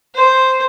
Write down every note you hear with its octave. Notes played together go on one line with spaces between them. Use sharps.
C5